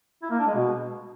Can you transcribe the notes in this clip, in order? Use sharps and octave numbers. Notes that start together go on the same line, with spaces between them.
E4
A#3
D4
G#3
B2